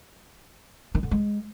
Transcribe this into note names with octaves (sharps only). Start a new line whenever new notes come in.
D#3
D3
G#3